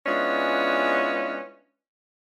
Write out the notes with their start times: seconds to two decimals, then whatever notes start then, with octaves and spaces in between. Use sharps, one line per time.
0.06 G#3 B3 C#4 D4 E4 F4